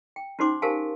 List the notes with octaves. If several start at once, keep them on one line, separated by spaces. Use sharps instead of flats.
G5
C#4 D#4 F#4 C5 C6 D6
G4 A#4 C5 F5 G#5 A5